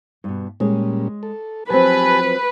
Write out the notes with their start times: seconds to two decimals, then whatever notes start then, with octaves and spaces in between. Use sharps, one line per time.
0.24 G2 B2
0.60 A#2 G3 G#3 C#4 G#4 C#5
1.23 A4
1.70 F3 F#3 C4 G4 B4 G#5 A5